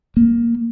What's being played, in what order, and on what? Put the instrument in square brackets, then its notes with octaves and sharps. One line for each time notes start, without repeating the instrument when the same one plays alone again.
[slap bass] A#3